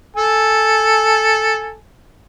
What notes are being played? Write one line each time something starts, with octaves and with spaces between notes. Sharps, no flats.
A4 G#5